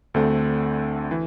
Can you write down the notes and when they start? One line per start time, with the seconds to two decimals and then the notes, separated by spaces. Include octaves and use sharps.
0.14 D2 D3 A3 C4
1.11 E3